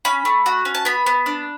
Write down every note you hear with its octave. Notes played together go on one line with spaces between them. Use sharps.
C#4 B5
A3
F#4
C#4
A5
B3 B5
B3
D4